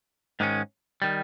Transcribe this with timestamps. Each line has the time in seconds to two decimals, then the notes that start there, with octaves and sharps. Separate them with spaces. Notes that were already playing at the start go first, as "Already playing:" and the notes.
0.40 G#2 D#3 G#3 C#4
1.02 D#3 G3